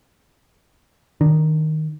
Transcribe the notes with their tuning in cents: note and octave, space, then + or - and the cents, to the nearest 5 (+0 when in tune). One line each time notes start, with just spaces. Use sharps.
D#3 +0 D4 +0